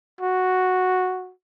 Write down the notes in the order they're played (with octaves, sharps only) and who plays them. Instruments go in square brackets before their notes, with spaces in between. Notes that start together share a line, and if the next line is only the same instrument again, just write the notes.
[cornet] F#4